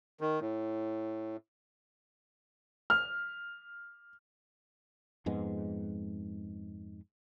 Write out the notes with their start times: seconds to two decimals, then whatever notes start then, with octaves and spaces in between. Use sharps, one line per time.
0.21 D#3
0.41 A2
2.90 F6
5.26 F2 G#2 G#3 B3